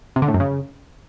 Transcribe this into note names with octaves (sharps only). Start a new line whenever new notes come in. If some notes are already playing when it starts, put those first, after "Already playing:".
C3
D3
A2
F#2
C#3